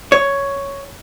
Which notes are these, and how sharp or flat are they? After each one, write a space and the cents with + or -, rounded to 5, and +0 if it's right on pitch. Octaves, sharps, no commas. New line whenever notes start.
C#5 +5